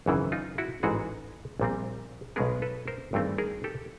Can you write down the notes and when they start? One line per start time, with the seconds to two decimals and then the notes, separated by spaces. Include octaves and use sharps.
0.06 G#1 F#2 C#3 E3
0.32 D#4 F4
0.58 E4 F#4
0.83 A1 G#2 E3 G#3 F#4 G#4
1.60 A#1 A#2 G3 C4
2.36 B1 B2 G#3 B3 G#4 A#4
2.62 A4 B4
2.88 A#4 C5
3.13 G#1 G2 E3 A3 C4
3.38 G#4 A#4
3.64 G4 A4